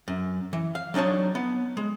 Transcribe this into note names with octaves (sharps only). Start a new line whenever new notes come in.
F#2
E3
F5
F#3 D4 D#4 C#5 A5
B3
G#3